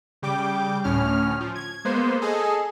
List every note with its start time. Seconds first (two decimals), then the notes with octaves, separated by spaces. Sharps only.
0.22 C#3 G3 G5 D6
0.84 D2 A2 C#4 F6
1.40 F3
1.56 G#6
1.85 G#3 A#3 B3 C5
2.22 G#4 A4 D#5 G#5